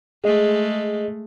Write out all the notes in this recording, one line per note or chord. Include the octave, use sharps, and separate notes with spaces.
G#3 A3 G#4 D#5